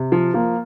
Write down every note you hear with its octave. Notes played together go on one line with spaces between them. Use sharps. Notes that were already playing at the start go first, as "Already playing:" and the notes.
Already playing: C3
F3
F3 A#3